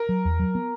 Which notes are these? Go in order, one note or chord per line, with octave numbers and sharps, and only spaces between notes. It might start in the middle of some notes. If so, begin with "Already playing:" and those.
Already playing: A#4
F#3
E2
F#3
B3